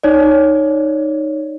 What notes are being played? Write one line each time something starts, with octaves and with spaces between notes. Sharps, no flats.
D#4 C#5 D5